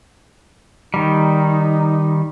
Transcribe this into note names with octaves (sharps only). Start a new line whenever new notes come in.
D#3 G3 D#4